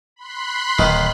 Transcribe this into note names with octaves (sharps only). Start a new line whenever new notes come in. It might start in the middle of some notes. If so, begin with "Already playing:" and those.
B5 C6 F#6
D1 D#3